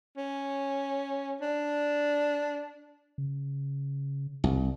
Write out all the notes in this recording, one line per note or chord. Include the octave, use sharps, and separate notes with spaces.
C#4
D4
C#3
C2